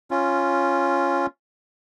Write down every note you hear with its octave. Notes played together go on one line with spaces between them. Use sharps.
C#4 F4